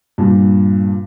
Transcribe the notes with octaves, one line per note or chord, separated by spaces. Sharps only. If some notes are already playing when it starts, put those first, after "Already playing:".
G2 A#2